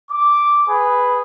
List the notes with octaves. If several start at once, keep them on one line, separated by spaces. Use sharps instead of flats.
D6
G#4 B4